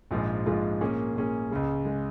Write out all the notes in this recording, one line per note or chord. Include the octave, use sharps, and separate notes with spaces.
A#1 G#2 F3 G#3 F4
A#1 G#2 F3 G#3 F4
A#2 A#3 C#4 G#4
A#2 A#3 C#4 G#4
C#2 C#3 G#3
C#3 G#3